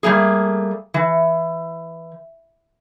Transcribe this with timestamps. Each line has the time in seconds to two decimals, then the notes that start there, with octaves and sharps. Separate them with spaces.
0.03 G3 A3 A#3 G#4
0.94 E3